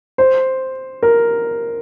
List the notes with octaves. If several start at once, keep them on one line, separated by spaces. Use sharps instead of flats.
C5
A#4